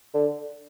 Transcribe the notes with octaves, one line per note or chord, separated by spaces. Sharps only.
D3